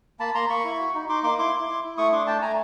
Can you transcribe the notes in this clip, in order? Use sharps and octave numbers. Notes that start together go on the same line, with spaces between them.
A#3 A5 B5
A#3 A#5 C6
A#3 B5 C#6
E4
F#4
D#4
D#4 C6 D6
A#3 C6 D6
E4 C6 D6
E4
E4
E4
A3 C#6 D#6
D4 C6 D6
A3 G5 A5
A3 G#5 A#5